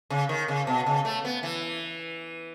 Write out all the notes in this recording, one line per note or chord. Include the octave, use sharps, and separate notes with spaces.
C#3
D#3
C#3
B2
C#3
A3
B3
E3